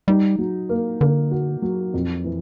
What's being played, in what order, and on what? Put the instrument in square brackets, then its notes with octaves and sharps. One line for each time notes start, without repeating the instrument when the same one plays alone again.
[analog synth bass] G3 [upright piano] D#4
[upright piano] F#3
A#3
[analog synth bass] D3 [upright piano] A#3
[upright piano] F#4
F#3
F2
E3